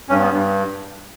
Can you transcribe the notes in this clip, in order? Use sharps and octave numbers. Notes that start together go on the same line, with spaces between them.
G2 C#4
B3
G2